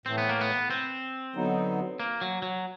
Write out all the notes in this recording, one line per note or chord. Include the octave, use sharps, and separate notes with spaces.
A2 E3 A3 C4
B3
A#3
B3
C4
D3 F#3 B3 D#4
A#3
F#3
F#3